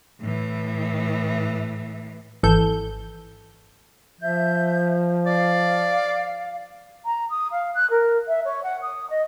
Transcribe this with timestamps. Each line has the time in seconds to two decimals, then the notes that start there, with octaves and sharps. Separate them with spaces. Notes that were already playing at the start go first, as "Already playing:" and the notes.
0.20 A2 E3
2.43 G#1 E3 A4 G6
4.21 F3 E5 G6
5.26 D5 F5
7.05 A#5
7.30 D#6
7.51 F5
7.74 F#6
7.90 A#4
8.27 E5
8.45 C#5
8.63 F#5
8.82 D#6
9.10 D#5